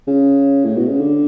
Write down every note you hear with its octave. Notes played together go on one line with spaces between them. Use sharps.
C#3
A2
B2
C#3
D3